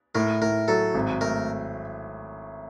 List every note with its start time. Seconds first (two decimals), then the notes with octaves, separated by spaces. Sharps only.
0.15 A2 A#4
0.41 A2 A#4
0.68 F#3 A4
0.94 G#1
1.21 A3 A#4